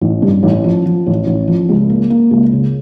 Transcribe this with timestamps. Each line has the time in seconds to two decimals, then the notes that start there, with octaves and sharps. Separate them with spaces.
0.01 A1
0.22 G2
0.43 A1
0.64 F3
0.86 F3
1.06 A1
1.27 A1
1.48 F3
1.69 C#2
1.90 A#3
2.10 A#3
2.31 C#2
2.53 C#3